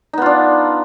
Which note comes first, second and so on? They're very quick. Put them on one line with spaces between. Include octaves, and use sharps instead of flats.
D#4 B3 F4 D4